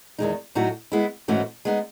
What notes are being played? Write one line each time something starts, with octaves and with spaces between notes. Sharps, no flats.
E2 D#3 G#3 D#4
A2 F#3 A3 D#4 F#4
G#3 B3 E4
G#2 E3 A3 C#4 F#4
G#3 B3 D#4